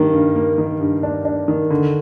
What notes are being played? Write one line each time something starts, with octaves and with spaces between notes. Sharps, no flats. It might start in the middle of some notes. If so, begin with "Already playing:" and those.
Already playing: G2 D#3 A#3
G2
A#3
D#3
G2
D4
D4
D#3
D3